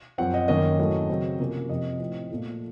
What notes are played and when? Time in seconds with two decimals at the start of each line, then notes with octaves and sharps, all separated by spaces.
0.18 F#2 F3 C4 F#5
0.34 D#5
0.48 F#2 D#3 A#3 C#4 D#5
0.79 A2 F#3 A3 C#4
1.09 C#3 F#3 C4
1.39 C3 F3 A#3 C#4
1.69 F2 C3 F3 C4 D#5
2.00 A2 F3 C4
2.31 A#2 F3 A3